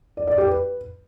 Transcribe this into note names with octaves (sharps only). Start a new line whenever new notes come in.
D5
D5
G4
B4